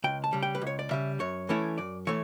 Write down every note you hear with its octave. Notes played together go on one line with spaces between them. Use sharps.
C#2 G5
A5
C#3 G3
G5
B4
C#2
C#5
D5
C#3 G3 E5
F#2 C#5
E3 A3 C#4 E4
F#2 D5
E3 A3 C#5